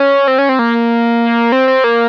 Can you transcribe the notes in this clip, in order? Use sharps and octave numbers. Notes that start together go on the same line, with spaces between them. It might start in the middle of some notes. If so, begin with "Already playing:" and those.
Already playing: C#4
C4
C#4
C4
A#3
C4
C4
A#3